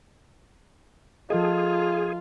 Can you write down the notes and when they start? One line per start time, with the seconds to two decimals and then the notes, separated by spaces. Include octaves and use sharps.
1.30 F3 F4 G#4 A4 D#5